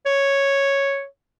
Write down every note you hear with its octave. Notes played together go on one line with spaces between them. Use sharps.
C#5